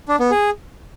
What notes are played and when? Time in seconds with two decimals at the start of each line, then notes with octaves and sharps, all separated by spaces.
0.08 D4
0.20 B3
0.31 G#4